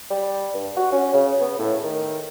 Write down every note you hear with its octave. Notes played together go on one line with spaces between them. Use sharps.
G3
G2
F#4
C#4
C#3
B3
A2
D#3